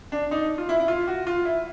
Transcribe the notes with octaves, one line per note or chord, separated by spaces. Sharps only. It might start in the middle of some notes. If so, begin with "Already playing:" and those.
D4
D#4
F4
E4
E4
F4
F#4
F4
E4